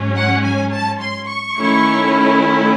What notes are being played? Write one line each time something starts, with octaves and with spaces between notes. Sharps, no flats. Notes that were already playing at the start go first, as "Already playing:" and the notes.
Already playing: G#2 F#3 C#4
F#5
G#5
A5
C6
C#6
D#3 A3 C#4 E4